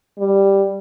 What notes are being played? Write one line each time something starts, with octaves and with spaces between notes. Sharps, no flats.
G3